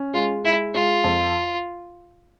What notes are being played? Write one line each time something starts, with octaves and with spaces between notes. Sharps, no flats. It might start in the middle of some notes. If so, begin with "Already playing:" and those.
Already playing: C#4
G#3 F4
G#3 E4
G#3 F4
F2